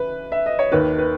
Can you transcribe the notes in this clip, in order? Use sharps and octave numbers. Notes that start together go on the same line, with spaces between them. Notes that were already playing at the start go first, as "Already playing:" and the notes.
Already playing: C#3 E3 C#4 B4
E5
D#5
C#5
D#2 D#3 A#3 B4
B4